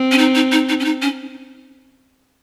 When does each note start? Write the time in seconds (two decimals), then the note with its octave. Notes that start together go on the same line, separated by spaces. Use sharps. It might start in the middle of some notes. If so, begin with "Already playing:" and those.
Already playing: C4
0.12 C#4
0.18 D#4
0.35 D#4
0.52 D#4
0.69 D#4
0.80 C#4
0.85 D#4
1.02 C#4